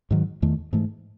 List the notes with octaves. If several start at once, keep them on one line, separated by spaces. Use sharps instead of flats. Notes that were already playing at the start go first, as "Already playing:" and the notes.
G#2 D#3 F#3
E2 D#3 A3
G#2 E3 A3